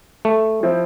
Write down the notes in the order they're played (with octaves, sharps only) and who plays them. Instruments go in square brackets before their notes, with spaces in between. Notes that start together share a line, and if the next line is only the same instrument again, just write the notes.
[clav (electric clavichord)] A3
[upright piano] F3 C4 E4